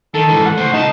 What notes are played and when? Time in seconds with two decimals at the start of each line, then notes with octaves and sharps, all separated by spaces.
0.14 D#3 A4
0.29 G#2 E3
0.46 F#5
0.57 A3 C5
0.73 C#2 D#4 A5